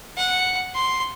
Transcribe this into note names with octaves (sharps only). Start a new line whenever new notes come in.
F#5
C6